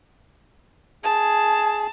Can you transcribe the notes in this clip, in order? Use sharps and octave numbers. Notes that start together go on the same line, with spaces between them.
G#4 A5